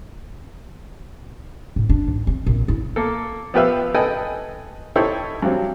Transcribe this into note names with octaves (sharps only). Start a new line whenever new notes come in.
A2
D4
G#2
C4
A#1
E4
A#3 A4
F3 B3 G4 B4 E5 F5
A4 B4 D#5 G5 G#5
D#4 E4 G4 A4 C5 C#5
G2 F#3 C4